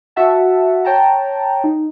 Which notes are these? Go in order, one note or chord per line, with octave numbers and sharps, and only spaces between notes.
F#4 E5 F#5 A5
C#5 G5 A5 A#5
D#4